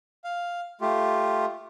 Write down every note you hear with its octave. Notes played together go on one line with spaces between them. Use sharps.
F5
A3 F4 G4